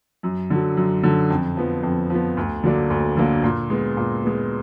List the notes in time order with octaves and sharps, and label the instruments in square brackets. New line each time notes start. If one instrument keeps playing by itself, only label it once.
[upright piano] F#2
D3 F#3
F#2
D3 F#3
F2
F3 B3
F2
F3 B3
D2
D3 F#3 A#3 D4
D2
D3 F#3 A#3 D4
A#2
G#3 B3
A#2
G#3 B3